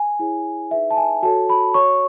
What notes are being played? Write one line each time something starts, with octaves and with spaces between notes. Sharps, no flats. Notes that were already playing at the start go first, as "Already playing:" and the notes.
Already playing: G#5
E4 G#4 C#5
D#4 G#4 B4 E5
A5
G#5
F#4 A4 C#5 A5
B5
F#4 C#5 C#6